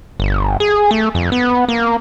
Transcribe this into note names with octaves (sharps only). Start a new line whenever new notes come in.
G1
G#4
A3
F2
B3
A#3